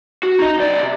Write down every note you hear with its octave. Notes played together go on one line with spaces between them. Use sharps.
F#4
D#4 D#5
B1 D5
C3